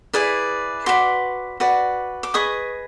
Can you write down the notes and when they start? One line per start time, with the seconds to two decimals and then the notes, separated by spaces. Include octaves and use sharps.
0.14 E4 G#4 B4 D5
0.86 F#4 B4 D5 C6 D6
1.60 F#4 B4 D5
2.23 D6
2.34 G#4 B4 D#5 C#6 D#6